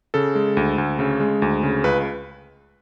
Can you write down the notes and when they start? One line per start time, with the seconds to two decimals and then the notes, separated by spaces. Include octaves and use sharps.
0.14 C#3 A4
0.35 G#3
0.57 D2
0.78 D2
0.99 C#3
1.20 G#3
1.42 D2
1.63 C#3
1.84 C#2 B4